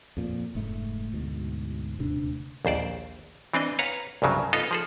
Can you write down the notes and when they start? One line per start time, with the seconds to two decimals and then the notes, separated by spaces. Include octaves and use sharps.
0.17 F2 A#2
0.55 F1 G#2 A3
1.13 D2 G#2 B2
1.98 D#1 D2 C3 D4
2.65 A#1 D#2 C5 D5
3.54 E3 C4 D4 D#5
3.79 B4 C#5 F5 F#5 A#5
4.22 C2 G2 C#3 F#3
4.53 B3 D#4 F4 A4 D#5 F5
4.71 F3 G#4 A4